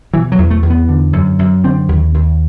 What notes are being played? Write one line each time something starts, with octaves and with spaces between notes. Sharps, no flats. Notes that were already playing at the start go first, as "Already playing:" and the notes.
B2 E3
F#3
E2
A3
E2
B3
D3
F#2
F#2
D3 C4
D#2
D#2